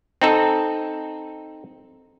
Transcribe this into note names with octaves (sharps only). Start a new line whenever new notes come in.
C4 D#4 A4